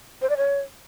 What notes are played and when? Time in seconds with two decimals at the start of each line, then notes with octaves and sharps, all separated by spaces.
0.22 C5
0.29 D5
0.37 C#5